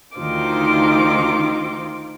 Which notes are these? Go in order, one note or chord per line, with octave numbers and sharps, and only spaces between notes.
D2 D#3 D#4 F4 C5 D6